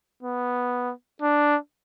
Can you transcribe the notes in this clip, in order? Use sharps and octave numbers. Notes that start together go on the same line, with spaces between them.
B3
D4